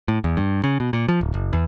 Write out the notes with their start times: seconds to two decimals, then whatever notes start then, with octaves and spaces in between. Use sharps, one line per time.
0.08 A2
0.24 E2
0.37 G2
0.64 C#3
0.80 B2
0.93 A#2
1.08 F3
1.21 D1
1.34 F#1
1.53 E2